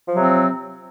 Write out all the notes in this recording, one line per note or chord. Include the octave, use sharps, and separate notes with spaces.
C3 F3 F#3 C4